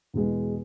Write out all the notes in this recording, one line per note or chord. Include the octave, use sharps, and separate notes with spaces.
E2 B2 G#3 B3